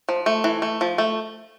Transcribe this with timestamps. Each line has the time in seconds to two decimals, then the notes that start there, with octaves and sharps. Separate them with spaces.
0.09 F3
0.26 A3
0.44 E3
0.62 A3
0.81 F3
0.98 A3